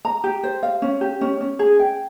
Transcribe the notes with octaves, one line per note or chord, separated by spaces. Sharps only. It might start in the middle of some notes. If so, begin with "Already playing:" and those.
A#5
G4
C5
F5
C#4
G4
C#4
C#4
G#4
G5